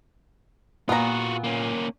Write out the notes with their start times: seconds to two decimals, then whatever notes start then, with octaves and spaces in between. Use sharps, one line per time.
0.89 A#2 B3 F4 F#4 A#5
1.44 A#3 C#4